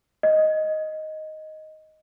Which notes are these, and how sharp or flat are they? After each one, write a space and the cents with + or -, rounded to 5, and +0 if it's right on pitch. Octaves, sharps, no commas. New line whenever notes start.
D#5 +5